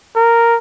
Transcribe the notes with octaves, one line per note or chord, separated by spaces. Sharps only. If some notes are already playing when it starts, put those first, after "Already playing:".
A#4